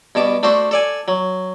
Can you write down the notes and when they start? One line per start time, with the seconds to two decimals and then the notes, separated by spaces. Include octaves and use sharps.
0.15 G2 B2 A5 D6
0.43 A3 D4 F#4 C5
0.71 A4 D5 G#5
1.08 F#3